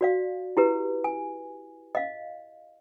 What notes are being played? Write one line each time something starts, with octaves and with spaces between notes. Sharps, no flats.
F#4 D5 F5
E4 G4 B4
G#5
D#5 F5